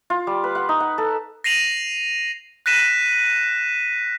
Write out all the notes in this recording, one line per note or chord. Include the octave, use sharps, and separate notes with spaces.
F4
G3
B4
F#5
D#4
F#5
A4
A#6 C7 D#7 F7 F#7
F#6 A#6 B6 D#7 E7